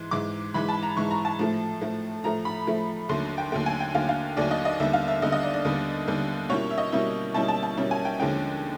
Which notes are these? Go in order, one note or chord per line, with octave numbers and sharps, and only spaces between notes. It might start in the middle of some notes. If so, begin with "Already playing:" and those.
Already playing: G#2 E3 G#3 C6
G#2 E3 G#3 D6
G#2 E3 G#3 B5
A5
A#5
G#2 E3 G#3 C#6
A#5
A5
A2 F3 A3
A2 F3 A3
A2 F3 A3 A#5
B5
A2 F3 A3
D#2 D3 F#3 A3 C6
G5
D#2 D3 F#3 A3 G5
G#5
G5
D#2 D3 F#3 A3 F5
F5
D#2 D3 F#3 A3 D5
D#5
D#5
D#2 D3 G3 B3 E5
F5
E5
D#2 D3 G3 B3 D#5
D#5
D5
D5
D#2 D3 G3 B3
D#2 D3 G3 B3
B2 G3 A#3 C#4 E4 C#5
E5
D#5
B2 G3 A#3 C#4 E4 E5
B2 G3 A#3 C#4 E4 A5
A5
A5
B2 G3 A#3 C#4 E4
G#5
G5
D#2 D3 F3 G#3 C#4 G5